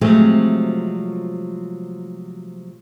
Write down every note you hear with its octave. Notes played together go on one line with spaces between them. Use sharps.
C3 F3 F#3 G#3 A3 C4